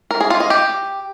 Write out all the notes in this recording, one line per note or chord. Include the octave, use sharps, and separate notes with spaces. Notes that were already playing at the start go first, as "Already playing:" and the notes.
A#4
G#4
F4
D#5
G4